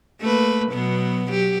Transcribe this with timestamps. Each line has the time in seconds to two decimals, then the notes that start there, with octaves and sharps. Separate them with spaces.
0.21 A3 A#3 B4
0.72 B2 F#3 B3
1.28 F#3 G4